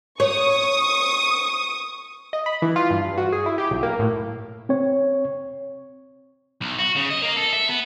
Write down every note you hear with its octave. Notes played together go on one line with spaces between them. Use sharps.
C#5 C#6 D#6
D#5
B5
E3
F4
G2
F#4
G#4
E4
G4
B1
A#3
A2
C4 C#5
B1
F#4
C#3
D#5
A#3
A4
E5
B3